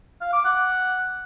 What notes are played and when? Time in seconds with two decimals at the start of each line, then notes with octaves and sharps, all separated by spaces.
0.21 F5
0.33 D6
0.45 F#5